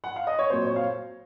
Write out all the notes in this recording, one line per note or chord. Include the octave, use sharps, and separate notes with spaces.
F#5
F5
D#5
C#5
A#2 F#3 C4 C5
C#5
F5